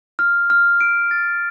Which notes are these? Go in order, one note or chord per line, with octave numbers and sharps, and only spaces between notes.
F6
F6
D7
A6